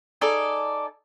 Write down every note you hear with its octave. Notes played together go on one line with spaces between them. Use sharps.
D#4 G#4 A4 D5